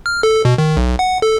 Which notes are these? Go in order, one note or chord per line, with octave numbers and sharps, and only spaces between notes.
F6
A4
B2
D#3
B1
F#5
A4